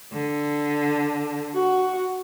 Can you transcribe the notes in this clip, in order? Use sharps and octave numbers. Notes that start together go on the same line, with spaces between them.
D3
F#4